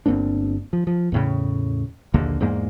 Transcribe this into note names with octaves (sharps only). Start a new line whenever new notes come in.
G1 A#3 C4 D4
F3
F3
E2 A2 C#3
A#1 D#2 D3 A#3
E2 G#2 G#3 A#3